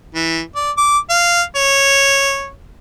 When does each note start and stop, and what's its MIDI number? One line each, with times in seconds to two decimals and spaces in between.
0.14 0.41 52
0.55 0.71 74
0.77 0.98 86
1.10 1.42 77
1.56 2.49 73